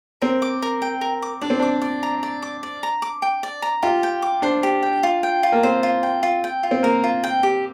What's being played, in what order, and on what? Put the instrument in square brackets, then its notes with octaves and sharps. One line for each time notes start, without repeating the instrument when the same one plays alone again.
[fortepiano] C4 [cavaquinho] A#4
[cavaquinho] D6
A#4
G5
A#4
D6
[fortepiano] D4 [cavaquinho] D5
[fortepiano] C4
[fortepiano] D4 [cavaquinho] D6
[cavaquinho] D5
A#5
D5
D6
D5
A#5
D6
G5
D5
A#5
[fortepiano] F4 [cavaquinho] G4
[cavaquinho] G5
D6
[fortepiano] D4 [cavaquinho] C5
[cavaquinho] G4
G5
F4
G5
F4
[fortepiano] A#3
[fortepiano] C4 [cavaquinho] C5
[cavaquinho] F4
G5
F4
G5
F4
[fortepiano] C4
[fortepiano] A#3 [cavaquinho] A#4
[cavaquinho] F4
G5
G4